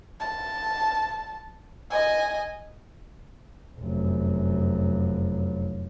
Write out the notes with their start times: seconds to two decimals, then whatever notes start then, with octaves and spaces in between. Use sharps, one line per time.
0.20 A5
1.91 D#5 G#5
3.79 F1 F#2